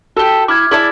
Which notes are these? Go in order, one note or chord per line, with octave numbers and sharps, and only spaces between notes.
F#4 G4 A4
E4 D6 F6 G#6
E4 G#4 D5 A5 G#6